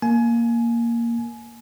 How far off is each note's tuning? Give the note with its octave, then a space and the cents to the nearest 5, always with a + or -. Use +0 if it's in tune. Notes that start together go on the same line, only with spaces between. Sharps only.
A#3 +0 G#5 +25